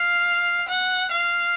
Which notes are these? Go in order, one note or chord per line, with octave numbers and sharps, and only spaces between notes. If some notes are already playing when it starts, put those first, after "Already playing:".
Already playing: F5
F#5
F5